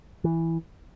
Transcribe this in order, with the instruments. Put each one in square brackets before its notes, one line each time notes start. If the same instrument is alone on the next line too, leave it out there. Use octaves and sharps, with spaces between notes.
[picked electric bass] E3